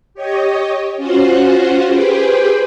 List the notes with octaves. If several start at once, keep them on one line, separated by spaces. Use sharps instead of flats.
G4 C#5 D#5
C#4 F4 F#4 C5 F#5
G4 G#4 B4 C5 G5